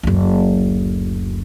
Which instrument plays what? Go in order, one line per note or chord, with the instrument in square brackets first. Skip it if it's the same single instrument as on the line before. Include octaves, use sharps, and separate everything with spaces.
[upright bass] F#1 D2